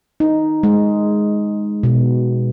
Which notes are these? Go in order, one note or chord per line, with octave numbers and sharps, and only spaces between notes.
D#4
G#3
B2